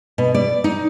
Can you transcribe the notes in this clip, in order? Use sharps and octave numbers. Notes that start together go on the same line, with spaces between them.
B2
D5
D#4